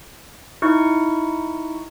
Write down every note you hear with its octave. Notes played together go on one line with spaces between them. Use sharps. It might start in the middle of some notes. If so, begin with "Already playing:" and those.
D#4 E4 C#6